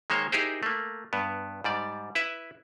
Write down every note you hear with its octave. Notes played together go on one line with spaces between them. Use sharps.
D#3 G#3 A#3 C5 C#5
D#4 E4 G4 G#4 A#4 C5
A3 A#3
G2 B3
G#2 G3 D5
E4 B4 E5